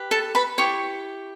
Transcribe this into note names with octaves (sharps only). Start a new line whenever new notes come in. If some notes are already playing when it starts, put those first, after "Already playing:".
Already playing: G4 B4
A4 A5
B4 B5
E4 G4 C#5 C#6